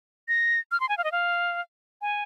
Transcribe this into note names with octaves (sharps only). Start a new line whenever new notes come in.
A#6
F6
C6
G#5
F5
D#5
F5
G#5